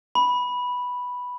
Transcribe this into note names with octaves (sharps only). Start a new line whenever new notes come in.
B5